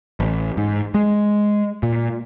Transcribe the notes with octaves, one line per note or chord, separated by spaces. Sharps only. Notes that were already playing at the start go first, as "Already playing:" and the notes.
A1
G#2
G#3
A#2